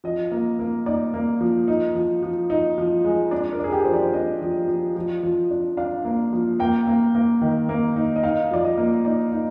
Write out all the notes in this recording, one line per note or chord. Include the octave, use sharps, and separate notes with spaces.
F3 D#5
A#3
A#3
D#4 D5
A#3
F3
D#4
F3
F3
D#4
F3
G#3
D4 D5
A#4
D4 G#4
G4
F3 C5
D5
D4 D#5
F3
F3
F3
F3
D4
D4 F5
A#3
F3
A#3 G5
A#3
A#3
D#3
A#3
D#4
D#5
D#4 F5
F3 D5
D#5
A#3
D#4 D5
D#4